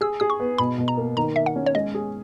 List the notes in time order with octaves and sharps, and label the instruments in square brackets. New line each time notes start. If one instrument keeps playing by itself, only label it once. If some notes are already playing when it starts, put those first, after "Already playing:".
[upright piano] G#4 [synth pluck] E6
[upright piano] G#4 [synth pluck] D#6
[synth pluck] C#6
[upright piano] B3
[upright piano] B2 [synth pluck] B5
[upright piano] B2
[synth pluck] A#5
[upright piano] A#3
[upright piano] D#3 [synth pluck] A#5
[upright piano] D#3 [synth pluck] E5
[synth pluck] F#5
[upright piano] C#4
[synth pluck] C#5
[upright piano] G#3 [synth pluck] D#5
[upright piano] G#4